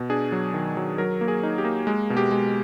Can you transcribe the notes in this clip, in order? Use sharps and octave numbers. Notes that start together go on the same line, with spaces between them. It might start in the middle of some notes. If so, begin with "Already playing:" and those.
Already playing: B2
D4 G#4
F#3
D#3
F#3
F#3 A#4
A#3
G#4
D#4
G4
A#3
G#3
B2
G4
G#3